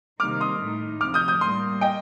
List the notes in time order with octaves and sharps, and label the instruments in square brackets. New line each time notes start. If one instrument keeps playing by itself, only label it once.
[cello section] C3 D#3 G3 A#3 D#4 [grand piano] D6 F6
[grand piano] C6 D#6
[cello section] A2 A3 D#4
[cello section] D2 C3 F3 [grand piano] D6 F6
[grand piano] D#6 G6
D#6 G6
[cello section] A2 G3 A#3 [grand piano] C6 D#6
[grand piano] D#5 G5